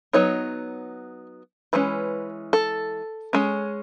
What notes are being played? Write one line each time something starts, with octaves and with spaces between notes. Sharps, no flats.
F#3 B3 D#4 C#5
E3 G#3 C#4 B4
A4
G#3 C#4